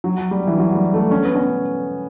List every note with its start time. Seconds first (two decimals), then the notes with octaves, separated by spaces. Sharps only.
0.04 F#3
0.31 G3
0.47 E3
0.58 F#3
0.75 G3
0.94 A3
1.11 C#4
1.24 B3
1.35 C#4